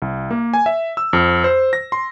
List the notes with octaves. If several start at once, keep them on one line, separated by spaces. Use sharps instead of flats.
C2
A#3
G#5
E5
E6
F2
C5
A#6
C6